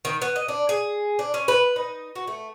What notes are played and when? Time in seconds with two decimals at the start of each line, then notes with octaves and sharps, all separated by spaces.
0.05 D#3
0.22 B3
0.36 D#5
0.48 D4
0.69 G#4
1.19 D4
1.34 C#4
1.48 B4
1.76 D#4
2.15 F#4
2.27 A3